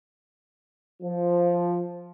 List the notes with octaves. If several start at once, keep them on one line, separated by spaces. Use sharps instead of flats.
F3